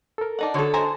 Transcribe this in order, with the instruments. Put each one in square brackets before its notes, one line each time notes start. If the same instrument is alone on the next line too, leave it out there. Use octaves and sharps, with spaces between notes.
[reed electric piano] A4 A#4
[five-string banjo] D4 D#4 F#5
[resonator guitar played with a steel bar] D3 A4 [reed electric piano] F#4 C#5 D#5
[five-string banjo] C5 G#5 A#5